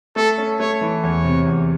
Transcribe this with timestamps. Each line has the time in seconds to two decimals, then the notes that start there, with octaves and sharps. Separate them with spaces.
0.16 A3 A4
0.38 C#4
0.60 A3 C#5
0.81 E3
1.03 E2 C#5
1.25 C3
1.47 E2